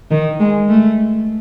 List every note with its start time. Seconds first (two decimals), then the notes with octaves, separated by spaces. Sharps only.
0.11 D#3
0.40 G#3
0.69 A3